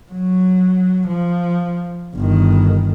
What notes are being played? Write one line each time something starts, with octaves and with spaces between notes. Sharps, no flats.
F#3
F3
G1 D#3